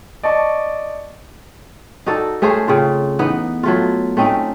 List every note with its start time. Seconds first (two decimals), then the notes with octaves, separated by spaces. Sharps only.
0.23 D5 D#5 A5 C#6
2.06 D#4 F#4 A4 D5
2.42 A3 C#4 G#4 C5
2.68 C#3 C4 F4
3.19 E3 B3 D#4
3.63 F#3 A3 F4
4.17 A3 C4 C#4 D#4